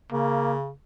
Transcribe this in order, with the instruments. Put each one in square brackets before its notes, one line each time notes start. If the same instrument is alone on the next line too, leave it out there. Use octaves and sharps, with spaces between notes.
[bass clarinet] C#3 [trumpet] A#3